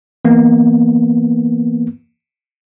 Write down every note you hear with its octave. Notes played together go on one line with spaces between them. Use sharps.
E3 A#3 B3